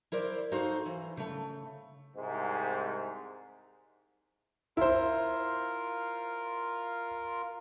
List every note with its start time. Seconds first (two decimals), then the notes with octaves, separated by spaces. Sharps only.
0.12 E4 A#4 C5 D5
0.52 D#4 F#4 A4 C5 F5
0.86 E3
1.17 C#3 A3
2.15 C2 G#2
4.77 E4 F4 A#4 C5